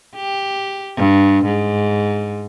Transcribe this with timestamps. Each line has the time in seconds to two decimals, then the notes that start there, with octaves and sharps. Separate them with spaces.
0.16 G4
0.96 G2
1.45 G#2